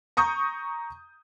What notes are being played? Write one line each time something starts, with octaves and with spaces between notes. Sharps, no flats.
A#5 C#6 D#6 G6